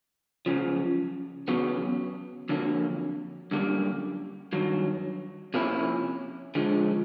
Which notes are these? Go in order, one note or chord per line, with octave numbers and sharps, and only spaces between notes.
F#2 C#3 F3
E2 C#3 F#3 B3
F2 D3 F#3 A#3
F#2 D3 G3 A#3
G2 D#3 F#3
C3 F3 A#3 C#4 E4
D3 F3 G#3